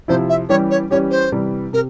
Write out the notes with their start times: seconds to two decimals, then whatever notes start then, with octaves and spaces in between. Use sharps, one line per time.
0.08 C3 F3 C4 E4 C5
0.29 E5
0.49 E3 G3 C#4 G4 C#5
0.70 C#5
0.91 E3 G3 C#4 G4 C#5
1.11 C5
1.32 C3 E3 G3
1.73 C3 A#4